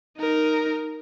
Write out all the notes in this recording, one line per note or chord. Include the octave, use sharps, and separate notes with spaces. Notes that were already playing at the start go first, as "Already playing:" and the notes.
D#4 A#4